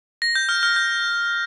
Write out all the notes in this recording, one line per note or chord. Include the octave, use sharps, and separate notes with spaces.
A#6
G6
F6
F6
G6